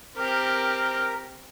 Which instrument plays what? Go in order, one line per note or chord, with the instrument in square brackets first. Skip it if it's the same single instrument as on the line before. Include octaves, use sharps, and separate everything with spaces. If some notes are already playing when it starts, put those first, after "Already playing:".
[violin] C4 G4 [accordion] A#4